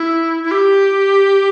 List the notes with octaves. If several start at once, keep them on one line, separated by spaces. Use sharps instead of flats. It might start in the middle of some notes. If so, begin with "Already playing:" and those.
Already playing: E4
E4
G4